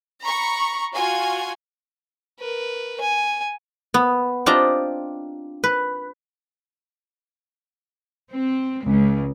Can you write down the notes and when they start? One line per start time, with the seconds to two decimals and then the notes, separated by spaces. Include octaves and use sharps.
0.22 A#5 B5 C#6
0.92 F4 F#4 G#5
2.40 A#4 B4
3.01 G#5
3.94 B3
4.46 C4 D4 F4 G4 D#5 A#5
5.64 B4
8.31 C4
8.84 C#2